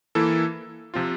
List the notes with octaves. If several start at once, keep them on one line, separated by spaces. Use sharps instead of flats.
E3 A#3 E4 A4
C3 F3 C4 F4